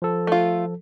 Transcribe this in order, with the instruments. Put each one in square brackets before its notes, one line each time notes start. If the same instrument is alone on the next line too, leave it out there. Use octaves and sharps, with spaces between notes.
[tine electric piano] F3 A4
[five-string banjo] A3 F4